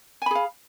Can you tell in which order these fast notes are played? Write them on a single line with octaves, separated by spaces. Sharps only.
G#5 B5 G#4 F5